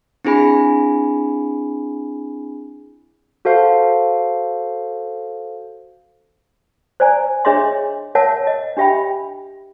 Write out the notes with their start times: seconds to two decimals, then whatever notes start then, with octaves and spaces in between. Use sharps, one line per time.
0.25 C4 D4 E4 G#4 G#5 B5
3.45 F#4 A4 C5 F5
7.00 C5 D5 G#5 A#5
7.45 D4 G#4 C#5 D#5 E5 C6
8.15 A#4 C#5 E5 F#5 A5
8.47 D#5
8.77 D4 G4 E5 G5 B5